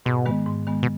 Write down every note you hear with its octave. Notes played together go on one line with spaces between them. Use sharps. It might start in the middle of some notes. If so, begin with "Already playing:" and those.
G#2 B2
D#3 G#3 B3
G#2
D#3 G#3 B3
B2